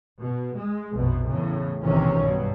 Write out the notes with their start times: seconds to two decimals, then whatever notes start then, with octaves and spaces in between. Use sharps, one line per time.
0.20 B2
0.56 G#3
0.95 A#1 F2 B2
1.29 E2 A2 C#3
1.82 B1 A2 C3 D#3 E3 C#4
2.19 G2 B2 F#3